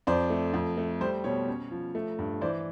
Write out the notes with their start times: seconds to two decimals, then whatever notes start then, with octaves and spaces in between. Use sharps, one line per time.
0.07 F2 C5 D5
0.30 A3
0.54 F2
0.77 A3
1.01 G3 C5
1.24 B2 C#5
1.48 C#4
1.71 F3
1.95 A3
2.19 G2
2.41 E3 C5 D5